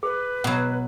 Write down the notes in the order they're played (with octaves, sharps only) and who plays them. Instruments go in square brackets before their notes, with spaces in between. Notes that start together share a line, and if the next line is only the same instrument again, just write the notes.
[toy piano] G#4 [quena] B4
[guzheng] B2 F#3 [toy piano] F#5